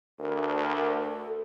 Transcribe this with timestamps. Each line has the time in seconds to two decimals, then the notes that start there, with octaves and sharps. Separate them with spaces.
0.20 D2 A#4
1.02 A4